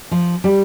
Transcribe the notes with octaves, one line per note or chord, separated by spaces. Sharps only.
F3
G3